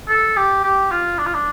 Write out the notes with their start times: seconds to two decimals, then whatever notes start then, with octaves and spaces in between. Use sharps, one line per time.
0.09 A4
0.37 G4
0.64 G4
0.91 F4
1.18 D4
1.26 F4
1.34 D4